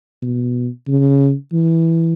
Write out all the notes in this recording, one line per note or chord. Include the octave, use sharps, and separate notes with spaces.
B2
C#3
E3